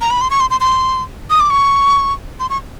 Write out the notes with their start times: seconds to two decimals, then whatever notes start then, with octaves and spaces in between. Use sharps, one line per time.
0.01 A#5
0.11 B5
0.21 C6
0.30 C#6
0.40 C6
0.50 C6
0.61 C6
1.30 D#6
1.40 D6
1.50 C#6
2.40 C6
2.50 C#6